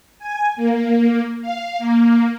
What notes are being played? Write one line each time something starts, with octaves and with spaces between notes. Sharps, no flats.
G#5
A#3
F5
A#3